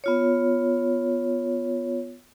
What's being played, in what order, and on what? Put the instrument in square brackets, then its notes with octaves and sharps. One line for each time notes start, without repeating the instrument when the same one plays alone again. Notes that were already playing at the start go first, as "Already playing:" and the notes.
[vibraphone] B3 F4 C#5